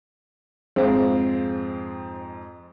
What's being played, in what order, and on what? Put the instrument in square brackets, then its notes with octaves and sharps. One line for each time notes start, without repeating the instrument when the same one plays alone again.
[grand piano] F2 G#2 [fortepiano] C4 [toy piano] G#4 E5 F5